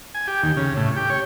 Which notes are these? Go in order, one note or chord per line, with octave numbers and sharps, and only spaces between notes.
G#5
G4
D#2
C#3
A2
G4
C#5